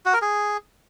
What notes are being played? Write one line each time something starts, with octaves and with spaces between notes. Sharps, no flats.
F#4
A#4
G#4